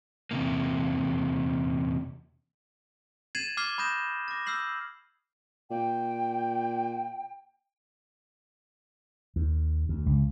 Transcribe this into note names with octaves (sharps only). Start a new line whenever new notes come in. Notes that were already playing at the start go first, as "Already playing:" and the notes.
E2 C3 A#3
G#6 A6 C7 D#7 E7 F#7
D6 F6 G#6 C7 G7
B5 D#6 G6 A#6 E7
D6 A#6
E6 F6 G6 C7 F#7
A#2 G5
D#2
D2
C#2